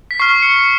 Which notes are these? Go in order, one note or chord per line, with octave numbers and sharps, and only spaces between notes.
B6
C#6 F6 C7
C#7